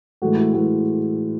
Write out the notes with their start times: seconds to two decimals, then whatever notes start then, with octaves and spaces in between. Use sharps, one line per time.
0.22 A2 E3 G#3 F#4
0.37 E4
0.53 A2 E3 G#3 F#4